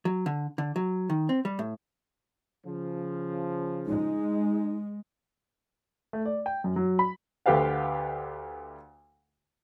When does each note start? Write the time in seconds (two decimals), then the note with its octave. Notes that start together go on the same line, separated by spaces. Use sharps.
0.05 F#3
0.26 D3
0.58 D3
0.76 F#3
1.10 D#3
1.29 C4
1.45 G3
1.59 A2
2.66 C#3 F3
3.86 G#3 D#4
6.13 A3
6.26 D5
6.46 G5
6.64 F#2
6.76 F#3
6.99 B5
7.46 D2 A3 G4 B4 F5 F#5